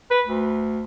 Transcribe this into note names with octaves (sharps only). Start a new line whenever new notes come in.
B4
D2